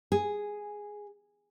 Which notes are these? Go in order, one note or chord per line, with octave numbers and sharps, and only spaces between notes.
G#4